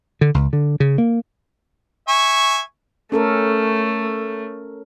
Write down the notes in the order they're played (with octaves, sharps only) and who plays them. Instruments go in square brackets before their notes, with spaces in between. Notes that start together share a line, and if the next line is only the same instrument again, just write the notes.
[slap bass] D3
C#2
D3
C#3
A#3
[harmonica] E5 G#5 C#6
[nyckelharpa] A3 [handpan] C#4 A4 A#4